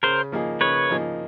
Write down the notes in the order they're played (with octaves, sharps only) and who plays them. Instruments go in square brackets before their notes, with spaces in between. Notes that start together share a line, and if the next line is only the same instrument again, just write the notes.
[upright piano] C#3 [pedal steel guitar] A#4 C5
[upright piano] F3 A#3 D#4 G#4
[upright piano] C#3 [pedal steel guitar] B4 C#5
[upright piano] F3 A#3 D#4 G#4